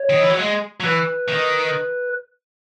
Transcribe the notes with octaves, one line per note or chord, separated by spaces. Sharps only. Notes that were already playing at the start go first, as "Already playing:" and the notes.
Already playing: C#5
D#3
E3
F#3
G#3
F#3
E3 B4
D#3